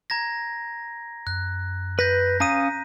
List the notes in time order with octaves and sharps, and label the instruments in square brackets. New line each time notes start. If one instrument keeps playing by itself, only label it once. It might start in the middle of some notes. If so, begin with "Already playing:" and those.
[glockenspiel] A#5 G#6 A#6
[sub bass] F#2 [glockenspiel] F#6
[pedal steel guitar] B4 [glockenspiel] G6 A#6 B6
[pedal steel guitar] C#4 F5 D#6 [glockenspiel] A#5 D#7